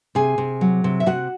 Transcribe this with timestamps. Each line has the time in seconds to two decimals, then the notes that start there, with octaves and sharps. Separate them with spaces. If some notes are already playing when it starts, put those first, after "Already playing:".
0.15 C3 G#4 G#5
0.38 C3
0.61 F#3
0.84 C3
1.00 E5
1.06 C3 F#4 F#5